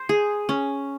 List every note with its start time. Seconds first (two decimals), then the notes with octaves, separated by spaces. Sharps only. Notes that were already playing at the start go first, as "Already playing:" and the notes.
Already playing: C5
0.09 G#4
0.49 C#4